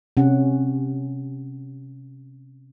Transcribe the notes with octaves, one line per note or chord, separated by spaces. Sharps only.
C3 C#4 F#5